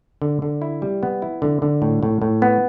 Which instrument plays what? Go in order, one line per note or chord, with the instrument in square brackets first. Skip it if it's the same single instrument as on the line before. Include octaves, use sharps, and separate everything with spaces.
[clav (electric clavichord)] D3
D3
E4
G3
B3
E4
D3
D3
A2
A2
A2
B3